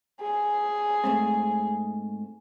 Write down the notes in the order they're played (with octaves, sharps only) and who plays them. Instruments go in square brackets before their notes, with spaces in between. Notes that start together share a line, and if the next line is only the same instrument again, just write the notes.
[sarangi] G#4
[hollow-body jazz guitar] G#2 A3 C4